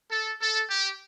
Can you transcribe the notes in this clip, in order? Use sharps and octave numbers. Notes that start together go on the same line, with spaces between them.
A4
A4
G4